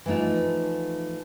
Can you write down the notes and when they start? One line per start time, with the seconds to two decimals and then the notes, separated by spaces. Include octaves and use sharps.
0.06 E3 F3 A3 D#4 F4